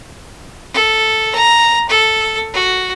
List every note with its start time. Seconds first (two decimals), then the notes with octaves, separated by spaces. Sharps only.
0.74 A4
1.35 A#5
1.89 A4
2.53 F#4